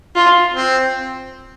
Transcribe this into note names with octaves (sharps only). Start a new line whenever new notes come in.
F4
C4